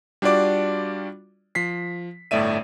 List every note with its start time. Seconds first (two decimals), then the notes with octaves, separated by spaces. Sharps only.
0.22 G3 D4 F4 F#4 D5 D6
1.55 F3 B6 C7
2.31 G1 A2 A3 D5 E5 D#7